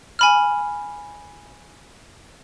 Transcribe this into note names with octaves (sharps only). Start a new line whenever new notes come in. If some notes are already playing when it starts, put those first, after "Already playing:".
G#5 B5 F6